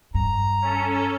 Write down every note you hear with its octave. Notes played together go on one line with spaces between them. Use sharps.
G2 A#5
C#4 A4